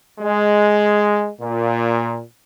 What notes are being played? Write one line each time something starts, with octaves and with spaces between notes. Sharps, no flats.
G#3
A#2